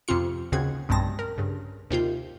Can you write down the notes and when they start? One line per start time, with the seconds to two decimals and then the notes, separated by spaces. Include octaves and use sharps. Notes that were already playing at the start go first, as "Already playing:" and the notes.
0.08 F2 C3 C4 F4 C#7
0.52 D#2 C#3 C4 F#4 G#4 G#6
0.89 B1 G2 G#3 C4 A5 A#6
1.19 A#4
1.38 G2 C#3
1.90 D#2 C3 F4 G6